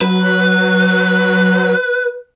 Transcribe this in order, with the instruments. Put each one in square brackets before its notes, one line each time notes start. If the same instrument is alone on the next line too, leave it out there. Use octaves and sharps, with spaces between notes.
[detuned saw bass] F#3 [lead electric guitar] B4